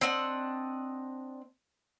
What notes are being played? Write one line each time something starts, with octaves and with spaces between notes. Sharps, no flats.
C4 D4 D#5 F#5